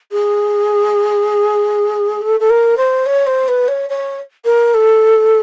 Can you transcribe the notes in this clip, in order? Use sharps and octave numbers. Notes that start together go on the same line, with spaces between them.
G#4
A4
A4
A#4
C5
C#5
C5
B4
C#5
C#5
A#4
A4